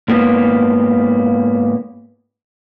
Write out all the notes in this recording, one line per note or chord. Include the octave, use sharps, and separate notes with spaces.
G#2 A#3 B3